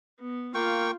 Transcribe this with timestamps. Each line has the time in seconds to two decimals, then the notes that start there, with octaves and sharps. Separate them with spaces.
0.19 B3
0.55 A#3 F4 G5 C#6